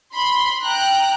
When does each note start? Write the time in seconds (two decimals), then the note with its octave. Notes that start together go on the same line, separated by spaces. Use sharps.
0.13 B5 C6
0.63 G5 A#5 F#6